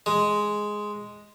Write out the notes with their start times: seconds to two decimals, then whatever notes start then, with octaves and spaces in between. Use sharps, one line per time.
0.06 G#3